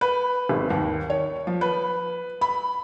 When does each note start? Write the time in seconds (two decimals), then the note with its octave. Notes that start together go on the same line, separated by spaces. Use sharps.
0.01 B4
0.49 G#1
0.70 D#2
1.10 C#5
1.47 F3
1.61 B4
2.41 B5